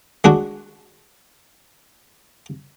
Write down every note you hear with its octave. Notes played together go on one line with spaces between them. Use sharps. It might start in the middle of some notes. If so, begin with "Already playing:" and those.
G#3 D4 F#4